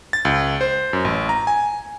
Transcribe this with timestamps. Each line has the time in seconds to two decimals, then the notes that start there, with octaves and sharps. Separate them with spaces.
0.13 A6
0.25 C#2
0.61 C5
0.93 F#2
1.05 A1
1.29 A#5
1.47 G#5